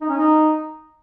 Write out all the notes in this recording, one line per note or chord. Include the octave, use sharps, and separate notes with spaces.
D#4
C#4
D#4